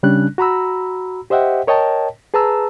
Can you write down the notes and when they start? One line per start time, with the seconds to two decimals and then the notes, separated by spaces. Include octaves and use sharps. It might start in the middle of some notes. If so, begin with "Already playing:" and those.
0.03 C#3 G3 C#4 D4 F#6
0.38 F#4 A#5 B5 E6
1.30 G4 C5 D#5 E5 F#5 G5
1.67 A#4 C#5 D#5 G5 A5
2.34 G#4 B4 A5 A#5 E6